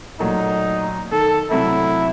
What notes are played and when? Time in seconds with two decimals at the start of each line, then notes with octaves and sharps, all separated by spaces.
0.20 A#2 F#3 A3 D#4
1.12 D#3 A4
1.51 C3 F#3 A3 E4